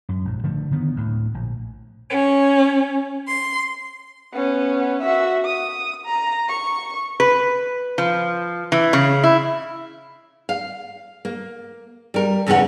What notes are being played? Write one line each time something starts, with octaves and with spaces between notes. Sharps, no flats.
F#2
A#1 G#2
D3 F3 A3
D3 D#3 B3
D2 A2
A#1
C#4
C6
B3 C#4
F#4 E5
D#6
A#5
C#6
B4
F3
E3
C#3
E4
F5
A#3
G3 A#4
E2 C#3 G#3 C#4 F#5